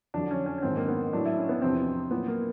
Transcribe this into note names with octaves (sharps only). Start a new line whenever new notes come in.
F2 D3 F#3 D4
C#4
C#4
C#4
G#2 D#3 F#3 C4
A#3
B3
A2 F#3 D4
E4
C#4
B3
E2 C3 F3 C4
A#2 F#3 B3
A#3